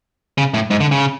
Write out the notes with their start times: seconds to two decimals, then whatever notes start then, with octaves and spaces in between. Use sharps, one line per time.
0.38 C#3
0.54 A2
0.70 G#2
0.81 D3
0.92 C#3